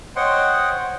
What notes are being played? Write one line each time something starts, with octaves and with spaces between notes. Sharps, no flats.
C5 C#5 D#5 F#5 G5 C6